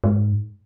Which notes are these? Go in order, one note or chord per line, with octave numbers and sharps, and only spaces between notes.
G#2